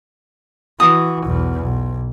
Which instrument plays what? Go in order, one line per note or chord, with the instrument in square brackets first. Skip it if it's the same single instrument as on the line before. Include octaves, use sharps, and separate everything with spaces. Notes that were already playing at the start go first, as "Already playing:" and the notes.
[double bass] E3 [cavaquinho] F#4 D#6
[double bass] B1 E2
B1